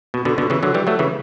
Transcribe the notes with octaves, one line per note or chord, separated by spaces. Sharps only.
B2
B2 D3
B2 D3
C#3 E3
D3 F#3
E3 G3
F#3 A3
C#3 E3